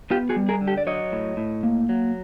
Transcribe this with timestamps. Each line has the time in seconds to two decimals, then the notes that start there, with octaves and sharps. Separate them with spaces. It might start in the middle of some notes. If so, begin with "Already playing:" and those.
0.10 B3 F4 G4
0.29 F#4 G#4
0.36 G3
0.49 G#4 A#4
0.61 D3
0.67 G4 A4
0.78 D5
0.87 F#3 C#5 D#5
1.12 A2
1.37 A2
1.63 A#3
1.89 F#3